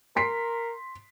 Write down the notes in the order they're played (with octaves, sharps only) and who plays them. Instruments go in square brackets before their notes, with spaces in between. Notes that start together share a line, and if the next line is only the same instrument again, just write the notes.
[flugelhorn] A#4 [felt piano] C6 B6 C7